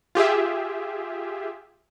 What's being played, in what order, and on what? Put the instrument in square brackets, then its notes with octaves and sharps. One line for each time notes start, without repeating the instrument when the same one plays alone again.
[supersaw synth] F4 G4 G#4 E5